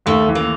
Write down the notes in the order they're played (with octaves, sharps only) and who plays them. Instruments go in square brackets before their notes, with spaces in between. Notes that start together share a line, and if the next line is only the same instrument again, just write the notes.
[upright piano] D#2 [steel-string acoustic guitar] A3
[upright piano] E3
[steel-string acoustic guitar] A#3